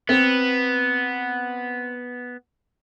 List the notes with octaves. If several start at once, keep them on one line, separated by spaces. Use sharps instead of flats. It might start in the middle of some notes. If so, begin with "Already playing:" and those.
B3 C4